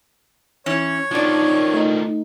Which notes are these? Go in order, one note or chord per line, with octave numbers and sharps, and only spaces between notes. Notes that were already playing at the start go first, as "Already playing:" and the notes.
E3 C#4 C#5
D#3 F3 D4 D5
A3 D#4